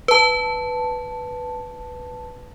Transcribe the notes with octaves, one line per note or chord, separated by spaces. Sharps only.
B4 A5